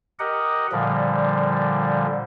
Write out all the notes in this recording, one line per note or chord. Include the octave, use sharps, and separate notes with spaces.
G4 A#4 D#5 F#5
A#2 D3 F3 G3